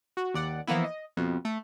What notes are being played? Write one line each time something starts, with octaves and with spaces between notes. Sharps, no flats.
F#4
D#2 D5 F#5
E3 F3 A#3 B3 E4
D#5
F2 B2
A3